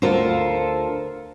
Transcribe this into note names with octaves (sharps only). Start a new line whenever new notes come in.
D2 F4 A4 A#4 C5